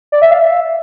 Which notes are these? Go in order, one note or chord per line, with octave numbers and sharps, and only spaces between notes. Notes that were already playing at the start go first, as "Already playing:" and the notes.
D5
E5
F5
E5